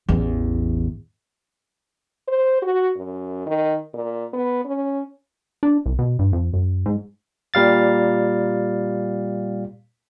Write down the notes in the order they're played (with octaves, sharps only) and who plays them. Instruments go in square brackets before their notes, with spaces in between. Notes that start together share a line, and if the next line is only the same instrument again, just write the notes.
[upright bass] A1 E2
[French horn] C5
F#4
F#2
D#3
A#2
B3
C#4
[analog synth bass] D4
C2
B2
G2
F2
F#2
G#2
[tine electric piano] A#2 G3 F5 A6